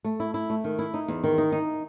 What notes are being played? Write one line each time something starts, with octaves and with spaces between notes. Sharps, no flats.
A3
E4
E4
A3
D#3
E4
D#4
E2
D#3
D#4
D#4